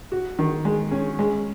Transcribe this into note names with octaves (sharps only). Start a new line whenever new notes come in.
F#4
D#3
G#3
C#4
G#3